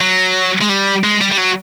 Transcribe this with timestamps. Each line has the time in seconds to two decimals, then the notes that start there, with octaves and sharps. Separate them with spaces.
0.01 F#3
0.61 G#3
0.69 G3
1.04 G#3
1.21 G3
1.31 G3
1.37 F#3